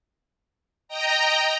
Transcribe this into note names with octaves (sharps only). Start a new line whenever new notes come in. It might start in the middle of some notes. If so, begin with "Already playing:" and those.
D#5 G5 A#5